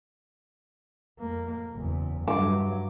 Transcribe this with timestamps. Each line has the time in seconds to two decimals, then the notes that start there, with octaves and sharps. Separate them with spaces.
1.19 F2 A#3
1.72 F#1 E2
2.28 G2 F#3 D6